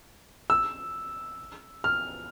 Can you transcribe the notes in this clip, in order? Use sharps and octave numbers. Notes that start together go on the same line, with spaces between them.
E6
F6